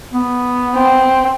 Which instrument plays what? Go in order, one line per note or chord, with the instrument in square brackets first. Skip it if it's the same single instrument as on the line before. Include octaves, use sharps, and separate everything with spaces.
[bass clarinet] B3
[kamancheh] C4